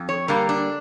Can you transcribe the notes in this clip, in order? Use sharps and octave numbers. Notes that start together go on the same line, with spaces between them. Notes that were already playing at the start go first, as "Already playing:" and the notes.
Already playing: F2
C#5
D3 G3 A#3 A#4
D4